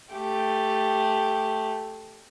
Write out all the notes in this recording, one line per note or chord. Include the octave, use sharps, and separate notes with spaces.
A3 G4